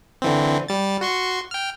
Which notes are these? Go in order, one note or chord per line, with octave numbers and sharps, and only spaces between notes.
D3 E3 C4
G3 A6
F#4 C6 C#6
G5 F6